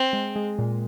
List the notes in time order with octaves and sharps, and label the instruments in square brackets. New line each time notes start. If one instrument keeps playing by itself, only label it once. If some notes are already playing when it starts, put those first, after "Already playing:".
Already playing: [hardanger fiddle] C4
[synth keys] G#3
G#3
A#2